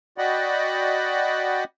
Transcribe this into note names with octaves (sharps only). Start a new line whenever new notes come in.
F#4 D5 D#5 F#5 G5 B5